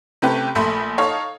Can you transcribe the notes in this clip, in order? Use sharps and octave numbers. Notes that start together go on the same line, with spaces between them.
C3 A3 C#4 G4 B4
A#1 A3 B5 C6
D#4 A4 C#5 D#5 F5